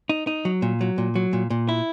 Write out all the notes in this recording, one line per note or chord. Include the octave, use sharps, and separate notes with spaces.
D#4
D#4
F#3
A#2
F#3
A#2
F#3
A#2
A#2
E4